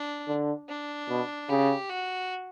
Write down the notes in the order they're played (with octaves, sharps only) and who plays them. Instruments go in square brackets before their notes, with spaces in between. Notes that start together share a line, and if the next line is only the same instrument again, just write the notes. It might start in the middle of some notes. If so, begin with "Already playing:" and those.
Already playing: [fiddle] D4
[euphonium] D3
[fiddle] D4
[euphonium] B2
[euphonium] C#3 [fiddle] G4
[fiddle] F#4